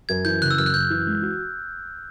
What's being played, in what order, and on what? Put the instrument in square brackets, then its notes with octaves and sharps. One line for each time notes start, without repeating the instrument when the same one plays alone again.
[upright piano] F#2 [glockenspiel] G#6
[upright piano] E3 [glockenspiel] G6
[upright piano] C#3 [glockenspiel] F#6
[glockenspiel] E6
[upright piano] F#2 [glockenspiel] F6
[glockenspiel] F#6
[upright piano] F#2 [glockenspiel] G6
[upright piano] E3
G#3
F#4